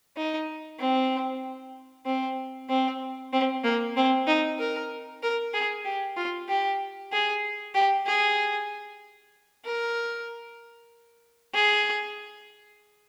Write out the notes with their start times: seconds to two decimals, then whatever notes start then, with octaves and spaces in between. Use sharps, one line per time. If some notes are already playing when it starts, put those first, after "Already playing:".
0.17 D#4
0.79 C4
2.06 C4
2.69 C4
3.33 C4
3.64 A#3
3.96 C4
4.27 D#4
4.59 A#4
5.23 A#4
5.54 G#4
5.85 G4
6.17 F4
6.48 G4
7.12 G#4
7.75 G4
8.06 G#4
9.65 A#4
11.54 G#4